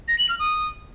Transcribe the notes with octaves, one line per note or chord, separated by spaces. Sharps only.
A#6
F#7
F6
D#6